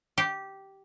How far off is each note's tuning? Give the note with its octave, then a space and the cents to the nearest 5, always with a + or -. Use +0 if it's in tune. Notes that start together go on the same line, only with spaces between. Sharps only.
G4 -10